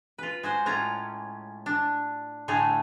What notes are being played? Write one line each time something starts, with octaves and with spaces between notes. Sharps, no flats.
F4 B4
G#3 F#4 C5
A2 G#3 C#4 F4 A#5
D4
A2 D3 A3 G#4 C#5